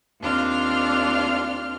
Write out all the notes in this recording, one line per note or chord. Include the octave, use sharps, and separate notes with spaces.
D#2 C4 D4 F4 F6